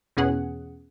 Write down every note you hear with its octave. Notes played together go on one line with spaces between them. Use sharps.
E2 B2 C#4 G#4 F#5